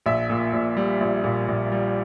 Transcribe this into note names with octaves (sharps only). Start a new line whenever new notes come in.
A#1 E5
A#2
A#1
G3
A#1
A#2
A#1
G3